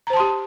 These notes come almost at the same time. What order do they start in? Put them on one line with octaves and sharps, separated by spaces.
A#5 C5 A5 C6 G4